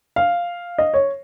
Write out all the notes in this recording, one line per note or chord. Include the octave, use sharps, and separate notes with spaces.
F5
D#5
C#5